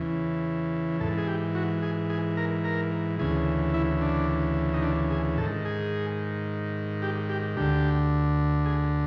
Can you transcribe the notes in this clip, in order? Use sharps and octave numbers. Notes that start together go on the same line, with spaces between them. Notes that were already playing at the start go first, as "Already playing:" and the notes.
Already playing: E2 C#3 E3
G#2 E3 A4
G#4
G4
F#4
G#4
G#4
A#4
A#4
D2 C#3 E3 G#4
E4
D4
D#4
D4
G#4
G#2 D#3 A4
G#4
G4
G4
D2 D3 G4
G#4